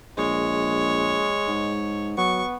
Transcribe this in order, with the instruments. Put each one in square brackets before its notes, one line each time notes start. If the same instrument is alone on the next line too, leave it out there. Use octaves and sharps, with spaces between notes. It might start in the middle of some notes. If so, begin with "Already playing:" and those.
[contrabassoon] A#1 [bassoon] G#3 [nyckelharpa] C#5
[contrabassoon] G#2
[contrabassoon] F#3 [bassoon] B3 [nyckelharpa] C#6